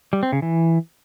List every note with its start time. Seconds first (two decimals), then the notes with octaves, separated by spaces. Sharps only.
0.13 G3
0.23 C4
0.33 C#3
0.42 E3